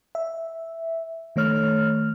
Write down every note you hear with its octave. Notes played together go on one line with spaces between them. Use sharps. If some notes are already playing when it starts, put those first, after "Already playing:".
E5
D#3 A3 C#5 F6